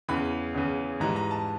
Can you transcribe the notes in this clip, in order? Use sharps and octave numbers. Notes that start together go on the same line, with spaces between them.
E2 C#3 E3 B5
E2 C#3 E3
G#2 E3 G3 A#5
A#5
A5